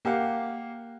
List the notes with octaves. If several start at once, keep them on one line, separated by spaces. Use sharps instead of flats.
A#3 G4 F5 F#5